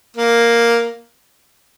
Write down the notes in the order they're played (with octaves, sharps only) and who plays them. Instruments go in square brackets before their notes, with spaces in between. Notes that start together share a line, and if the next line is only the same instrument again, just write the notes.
[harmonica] A#3